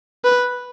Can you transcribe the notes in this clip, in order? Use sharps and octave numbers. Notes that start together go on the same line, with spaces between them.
B4